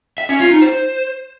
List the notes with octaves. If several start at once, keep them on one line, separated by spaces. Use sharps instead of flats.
E5
C#4
F4
D#4
C5